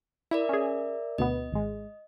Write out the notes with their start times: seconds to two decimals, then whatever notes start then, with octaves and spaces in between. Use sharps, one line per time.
0.31 E4 A#4 D5 E5
0.49 C#4 G#4
1.18 D2 B2 B3 D#5
1.52 G#1 G#3